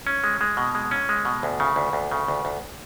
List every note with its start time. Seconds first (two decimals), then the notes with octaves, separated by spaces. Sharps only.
0.07 C#4
0.24 G#3
0.41 G#3
0.57 B2
0.75 G#3
0.91 C#4
1.09 G#3
1.25 B2
1.43 D2
1.60 C#3
1.76 D2
1.93 D2
2.11 C#3
2.28 D2
2.45 D2